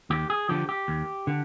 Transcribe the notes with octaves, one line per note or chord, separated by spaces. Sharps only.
D#2 G4
G#4
D3 F3 G4
G4
D#2
D3